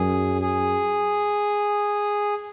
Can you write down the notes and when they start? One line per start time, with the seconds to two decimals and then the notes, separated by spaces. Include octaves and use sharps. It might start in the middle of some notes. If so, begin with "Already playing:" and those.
Already playing: F#2 G#4
0.41 G#4